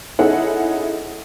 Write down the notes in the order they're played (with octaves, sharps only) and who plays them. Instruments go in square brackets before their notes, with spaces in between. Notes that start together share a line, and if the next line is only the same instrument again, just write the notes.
[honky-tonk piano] C#4 D#4 E4 G#4 A4 F#5